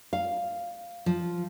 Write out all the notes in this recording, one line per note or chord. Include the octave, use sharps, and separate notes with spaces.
F5
F3